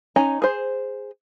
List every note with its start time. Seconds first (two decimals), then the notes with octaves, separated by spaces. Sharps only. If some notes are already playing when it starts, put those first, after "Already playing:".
0.16 C#4 D#4 G#5 A#5
0.42 G#4 C5